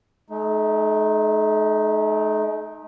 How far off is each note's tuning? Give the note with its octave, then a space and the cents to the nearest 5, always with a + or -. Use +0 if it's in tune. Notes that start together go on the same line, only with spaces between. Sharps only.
A3 -40 D#4 +0